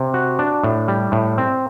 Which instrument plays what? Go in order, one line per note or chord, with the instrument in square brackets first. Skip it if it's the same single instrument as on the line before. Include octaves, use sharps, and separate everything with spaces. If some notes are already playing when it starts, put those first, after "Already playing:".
Already playing: [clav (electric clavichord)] C3
F#4
D4
A2
G3
A2
C4